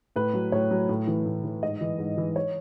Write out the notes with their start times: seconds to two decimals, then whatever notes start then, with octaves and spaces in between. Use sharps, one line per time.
0.16 A2 B4
0.33 F#3
0.52 A2 C#5
0.71 F#3
0.89 A2
1.07 E3
1.26 A2
1.44 E3
1.62 G#2 D#5
1.81 E3
1.99 G#2
2.18 E3
2.36 C#5